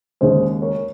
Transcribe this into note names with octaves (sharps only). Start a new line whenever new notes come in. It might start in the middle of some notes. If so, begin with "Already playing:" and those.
D#2 C#3 G#3 G#4 C5
A#4 C#5